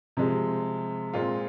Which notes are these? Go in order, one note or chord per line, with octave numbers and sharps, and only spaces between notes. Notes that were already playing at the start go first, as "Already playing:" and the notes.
C3 F3 G#3
A#2 G#3 C4 F4